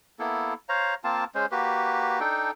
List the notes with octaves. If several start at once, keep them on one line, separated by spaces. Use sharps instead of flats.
A#3 B3 E4 A4
C5 C#5 F5 A#5
A#3 C4 F4 A5
G#3 C#4 C5
A#3 F#4 G4 B4
D4 D#4 A4 G5